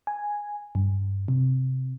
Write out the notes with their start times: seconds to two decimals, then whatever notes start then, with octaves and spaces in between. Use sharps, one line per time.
0.07 G#5
0.75 G2
1.28 C3